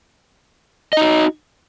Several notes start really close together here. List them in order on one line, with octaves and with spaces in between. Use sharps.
D#5 D#4 F#4